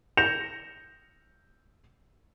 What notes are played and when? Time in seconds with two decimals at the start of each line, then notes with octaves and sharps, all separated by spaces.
0.17 G6 A#6 C#7 E7 F7